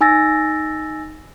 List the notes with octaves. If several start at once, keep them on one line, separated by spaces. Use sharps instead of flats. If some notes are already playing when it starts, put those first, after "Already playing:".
D#4 G#5 E6 A6 A#6